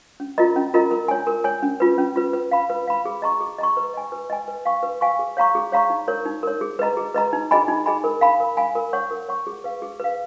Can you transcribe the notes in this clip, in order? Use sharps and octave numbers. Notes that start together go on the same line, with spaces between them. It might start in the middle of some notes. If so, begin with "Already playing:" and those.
C#4
F4 A#4 D#5 A#5
C#4
F4 A#4 D#5 A#5
A#4
C#5 G#5
A#4
C#5 G#5
C#4
F4 B4
C#4
F4 B4
B4
F5 B5
B4
F5 B5
G#4
D#5 A#5 C#6
G#4
D#5 A#5 C#6
B4
D#5 G#5
B4
D#5 G#5
B4
F5 G#5 C#6
B4
F5 G#5 C#6
G#4
C#5 F5 A#5 C#6
G#4
C#5 F5 A#5 C#6
D#4
A#4 C#5
D#4
A#4 C#5
G#4
B4 D#5 A#5
G#4
B4 D#5 A#5
D#4
G#4 D#5 G#5 B5
D#4
G#4 D#5 G#5 B5
A#4
F5 G#5 B5
A#4
F5 G#5 B5
A#4
C#5 F#5 C#6
A#4
C#5 F#5 C#6
G#4
B4 F5
G#4
B4 F5